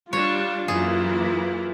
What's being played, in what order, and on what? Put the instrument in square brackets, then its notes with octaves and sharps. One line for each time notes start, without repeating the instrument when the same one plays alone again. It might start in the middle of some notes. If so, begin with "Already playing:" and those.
[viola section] G3 D4 [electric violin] F4 [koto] C#5
[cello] F#2 [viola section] E3 A#3 E4 [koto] G#4